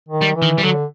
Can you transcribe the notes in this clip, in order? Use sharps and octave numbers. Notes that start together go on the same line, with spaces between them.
D#3
G3
E3
D#3
G3
D3 F#3